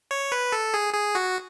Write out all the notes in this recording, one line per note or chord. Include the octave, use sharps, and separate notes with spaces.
C#5
B4
A4
G#4
G#4
F#4